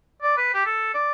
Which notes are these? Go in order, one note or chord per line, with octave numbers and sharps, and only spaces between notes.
D5
B4
G4
A4
D5